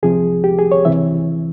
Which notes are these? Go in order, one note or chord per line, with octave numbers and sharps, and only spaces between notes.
C2 C3 F3 G#4
G4
G#4
C#5
C#2 C3 E3 E5